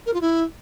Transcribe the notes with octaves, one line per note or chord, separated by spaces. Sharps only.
A#4
F4
E4